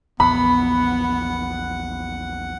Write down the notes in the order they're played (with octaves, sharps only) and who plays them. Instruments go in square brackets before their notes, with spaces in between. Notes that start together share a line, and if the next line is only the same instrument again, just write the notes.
[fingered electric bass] A#1 E2 [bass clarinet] B3 [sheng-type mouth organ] F#5 [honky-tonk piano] B5